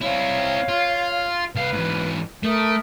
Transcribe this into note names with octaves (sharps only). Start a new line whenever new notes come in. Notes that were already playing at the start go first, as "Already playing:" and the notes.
C4 E4 C#5 F5
F4
C2 B4 F5
G#2 E3
A3 A#4 E5 D#6